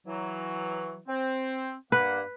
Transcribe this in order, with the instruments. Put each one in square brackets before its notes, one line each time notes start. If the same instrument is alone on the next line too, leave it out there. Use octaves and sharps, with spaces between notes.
[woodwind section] E3 F#3
C4
[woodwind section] G2 A#3 F#5 [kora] B4